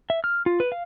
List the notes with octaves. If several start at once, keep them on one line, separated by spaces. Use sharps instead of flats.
E5
F6
F4
B4
F5